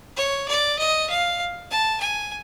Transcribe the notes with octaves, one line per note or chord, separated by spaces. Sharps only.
C#5
D5
D#5
F5
A5
G#5